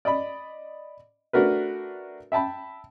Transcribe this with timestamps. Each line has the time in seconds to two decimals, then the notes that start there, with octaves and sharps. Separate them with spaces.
0.05 D5 D#5 B5
1.33 A3 D4 F#4 A#4 B4
2.32 E5 G5 A5 B5